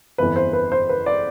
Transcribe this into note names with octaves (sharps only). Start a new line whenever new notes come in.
G1 F2 E3 B4
C5
B4
C5
B4
D5